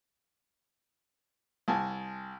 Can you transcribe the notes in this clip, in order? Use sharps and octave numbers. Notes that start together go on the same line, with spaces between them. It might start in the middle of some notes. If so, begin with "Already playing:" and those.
C2 G#5 A5